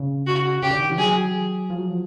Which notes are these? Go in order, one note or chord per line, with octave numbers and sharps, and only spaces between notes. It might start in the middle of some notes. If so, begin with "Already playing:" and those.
Already playing: C#3
F#4
C#3 G4
D3
D#3
E3
F#3 G#4
F3
F#3
F3